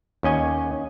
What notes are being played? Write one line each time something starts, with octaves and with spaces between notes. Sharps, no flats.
D#2 C#4 D#5 G#5